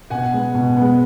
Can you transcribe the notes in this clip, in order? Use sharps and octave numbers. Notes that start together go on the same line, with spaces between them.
B2 F#5 G#5
G#3 B3
B2
G#3 B3